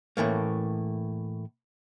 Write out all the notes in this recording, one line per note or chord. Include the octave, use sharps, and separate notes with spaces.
A2 E3 A3 A#3